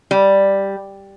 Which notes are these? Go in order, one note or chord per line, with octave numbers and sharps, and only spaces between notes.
G3